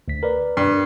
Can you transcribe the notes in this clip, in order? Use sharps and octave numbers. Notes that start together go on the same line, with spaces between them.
D2 B6
A#4 B4 D5
G2